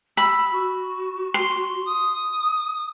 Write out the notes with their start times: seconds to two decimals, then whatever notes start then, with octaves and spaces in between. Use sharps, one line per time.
0.17 B5 E6
0.52 F#4
1.34 C6
1.85 D#6